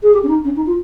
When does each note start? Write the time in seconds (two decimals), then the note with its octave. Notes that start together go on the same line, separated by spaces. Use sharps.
0.03 G#4
0.14 G4
0.23 C#4
0.29 D#4
0.44 C#4
0.56 D#4
0.66 F4